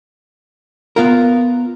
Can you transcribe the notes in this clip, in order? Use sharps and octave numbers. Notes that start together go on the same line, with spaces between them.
B3 F4 A#4